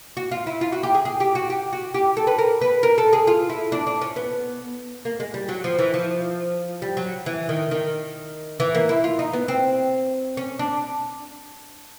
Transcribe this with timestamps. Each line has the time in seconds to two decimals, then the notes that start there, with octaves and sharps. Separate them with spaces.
0.17 F#4
0.31 F4
0.47 E4
0.61 F4
0.72 F#4
0.83 G4
0.95 G#4
1.05 G#4
1.20 G4
1.35 F#4
1.50 G4
1.73 F#4
1.94 G4
2.17 A4
2.27 B4
2.38 A#4
2.61 B4
2.83 A#4
2.98 A4
3.13 G#4
3.27 F4
3.50 E4
3.72 D4
3.87 D4
4.02 C#4
4.16 B3
5.05 A#3
5.20 G#3
5.34 G3
5.49 F#3
5.64 F3
5.79 E3
5.94 F3
6.82 G3
6.97 F#3
7.26 E3
7.49 D#3
7.71 D#3
8.60 E3
8.75 A#3
8.89 E4
9.04 F4
9.19 D#4
9.33 B3
9.48 C4
10.37 C#4
10.59 D4